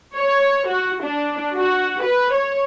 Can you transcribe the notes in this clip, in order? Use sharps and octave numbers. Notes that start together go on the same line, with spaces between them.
C#5
F#4
D4
F#4
B4
C#5